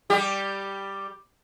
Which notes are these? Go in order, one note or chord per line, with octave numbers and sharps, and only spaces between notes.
G3 G4